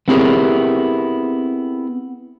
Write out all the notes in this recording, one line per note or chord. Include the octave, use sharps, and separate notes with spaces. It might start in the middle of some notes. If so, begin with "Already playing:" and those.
B3 C4 E4 G4 G#4 A#4